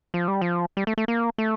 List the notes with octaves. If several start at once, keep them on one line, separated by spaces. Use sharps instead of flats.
F3
G3
F3
G3
A3
A3
A#3
A3